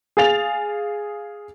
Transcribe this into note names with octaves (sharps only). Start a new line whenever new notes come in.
G#4 F5 A6 F7